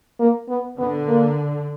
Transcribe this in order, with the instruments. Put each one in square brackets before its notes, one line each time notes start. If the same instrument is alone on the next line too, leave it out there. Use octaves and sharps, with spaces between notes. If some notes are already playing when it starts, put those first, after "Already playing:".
[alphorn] A#3
B3
[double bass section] D3 [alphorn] B3
[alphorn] A#3